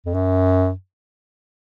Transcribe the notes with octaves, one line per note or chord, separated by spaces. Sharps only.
F2
F#2